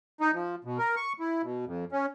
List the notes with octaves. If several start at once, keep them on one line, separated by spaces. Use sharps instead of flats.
D#4
F3
B2
A#4
C#6
E4
B2
F2
C#4